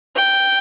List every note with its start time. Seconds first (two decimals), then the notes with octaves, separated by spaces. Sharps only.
0.16 G5